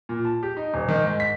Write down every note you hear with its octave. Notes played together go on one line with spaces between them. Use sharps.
A#2
A5
G4
D#4
D#1
D#3
G#2
B6